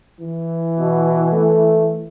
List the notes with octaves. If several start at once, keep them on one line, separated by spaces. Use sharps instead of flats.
E3
B2
A3